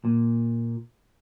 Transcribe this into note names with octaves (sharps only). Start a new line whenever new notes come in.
A#2